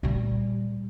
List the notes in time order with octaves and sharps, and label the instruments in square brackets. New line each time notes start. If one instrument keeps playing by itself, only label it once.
[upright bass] A#2 G3